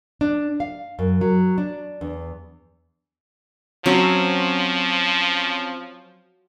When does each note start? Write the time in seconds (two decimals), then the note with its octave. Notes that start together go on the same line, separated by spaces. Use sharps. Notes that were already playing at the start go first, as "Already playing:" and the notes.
0.21 D4
0.60 F5
0.99 F#2
1.21 F#3
1.58 D4
2.01 E2
3.86 F3 F#3 C4 C#4 C#5